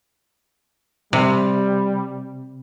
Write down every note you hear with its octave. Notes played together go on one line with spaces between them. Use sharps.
C3 G3